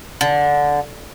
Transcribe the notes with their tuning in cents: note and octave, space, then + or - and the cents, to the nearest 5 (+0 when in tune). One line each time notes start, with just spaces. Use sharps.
D3 -10